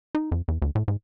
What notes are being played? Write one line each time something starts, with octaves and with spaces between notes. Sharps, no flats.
D#4
F2
E2
D2
A2
G#2